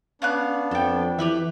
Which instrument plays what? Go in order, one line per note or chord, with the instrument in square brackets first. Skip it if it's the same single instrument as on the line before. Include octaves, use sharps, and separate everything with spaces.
[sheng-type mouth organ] B3 D4 [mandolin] C#4 F5 F#6
[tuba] F2 [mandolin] A4 G5
[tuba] E3 [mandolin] G4 B4 E5